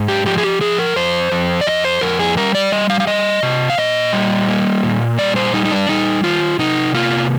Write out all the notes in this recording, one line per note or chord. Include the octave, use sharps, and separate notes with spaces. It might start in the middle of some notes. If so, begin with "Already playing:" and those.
Already playing: G#2
G4
F3 G4
G#4
G4
F3 G#4
A#4
F2 C5
F2
D5
F2 D#5
C5
F2 A#4
G#4
G3 A#4
D5
G3 D#5
F5
F5
G3 D#5
C3
F5
A#2 D#5
G3
A#3
A#2
G3 D5
C5
G3 D#4
D#4
D4
G3 D#4
D#3 F4
C3 D#4
A#3 F4